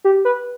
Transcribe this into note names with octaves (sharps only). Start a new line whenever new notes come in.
G4
B4